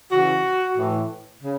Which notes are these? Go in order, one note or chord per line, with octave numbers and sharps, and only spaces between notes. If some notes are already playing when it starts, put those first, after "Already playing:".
C#3 E3 F#4
A2 E3
C#3